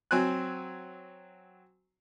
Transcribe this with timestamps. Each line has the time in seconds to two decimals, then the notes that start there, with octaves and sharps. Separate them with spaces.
0.11 F#3 C4 G#5 F#6